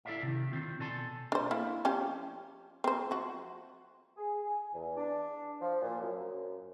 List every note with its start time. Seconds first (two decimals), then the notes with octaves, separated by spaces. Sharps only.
0.05 E4 A4 C5 D5 E5 F5
0.23 C3 D#3
0.52 D#3 C4 F4
0.80 B2 A4 D5 G#5 A5 C6
1.32 D4 C5
1.51 A#3 E4
1.85 F3 C#4 G4
2.84 C4 C5
3.11 F3 F#4
4.17 G#4
4.46 G#5
4.74 E2
4.97 D4
5.61 F3
5.82 A#2
5.99 F#2
6.18 F#2